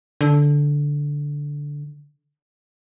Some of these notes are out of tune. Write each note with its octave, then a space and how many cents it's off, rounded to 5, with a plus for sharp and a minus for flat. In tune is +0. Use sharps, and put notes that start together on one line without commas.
D3 -10